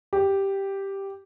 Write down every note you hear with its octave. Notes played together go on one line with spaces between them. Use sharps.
G4